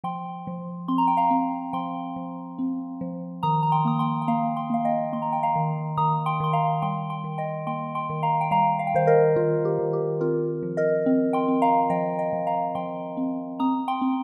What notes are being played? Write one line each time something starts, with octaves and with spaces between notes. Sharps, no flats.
F3 G5 C6
F3
C4 C6
A#5
G5
F5 A#5
C4
F3 G5 C6
F3
C4
F3
D#3 A#5 D#6
A#5
G5 C6
A#3 D#6
G5 C6
G5
A#3 F5 A#5
G5 C6
A#3 F5
D#5 G5
A#3 C6
A#5
G5
F5 A#5
D#3
D#3 A#5 D#6
G5 C6
D#3 C6
F5 A#5
G3 G5 C6
G5 C6
D#3
D#5 G5
A#3 G5 C6
G5 C6
D#3
F5 A#5
G5
G3 F5 A#5
F5
G5
D#3 C5 F5
A#4 D#5
D#3 F4
G4
D#3
G4
C4 F4 A#4
F3
A#4 D#5
C4
G5 C6
C4
F5 A#5
F3 D#5 G5
D#5 G5
F3
F5 A#5
F3 G5 C6
C4
C4 A#5 D#6
G5 C6
C4